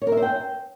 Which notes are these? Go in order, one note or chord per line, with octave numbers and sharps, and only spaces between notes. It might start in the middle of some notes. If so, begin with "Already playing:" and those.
C#5
A#4
E5
C5
G5